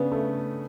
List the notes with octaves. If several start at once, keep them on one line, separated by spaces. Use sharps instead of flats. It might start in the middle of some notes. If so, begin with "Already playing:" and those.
Already playing: C#3 B3 D4
A3